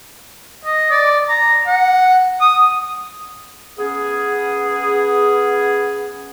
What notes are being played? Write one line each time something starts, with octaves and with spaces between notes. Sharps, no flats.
D#5
D5
A#5
F#5
D#6
B3 C#4 G#4